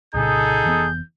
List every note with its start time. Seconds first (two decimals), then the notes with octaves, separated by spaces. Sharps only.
0.14 C2 A#2 C#3 D#4 G#4 A4 G6
0.64 F1 E3 B3